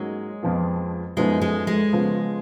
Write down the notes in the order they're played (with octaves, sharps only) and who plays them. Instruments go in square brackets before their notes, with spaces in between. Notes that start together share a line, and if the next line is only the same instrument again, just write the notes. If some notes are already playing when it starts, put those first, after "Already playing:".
Already playing: [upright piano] G#2 F#3 A#3 C#4 [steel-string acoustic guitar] G#3
[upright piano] F2 F3 B3 F4
[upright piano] F#2 F3 B3 D#4 [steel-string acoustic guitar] G#3
[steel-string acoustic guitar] G#3
G#3
[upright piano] C#3 F3 B3 F4